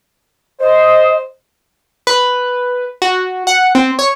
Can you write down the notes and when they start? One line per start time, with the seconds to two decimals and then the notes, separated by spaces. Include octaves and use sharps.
0.61 C5 D#5
2.07 B4
3.02 F#4
3.47 F#5
3.75 C4
3.99 C#5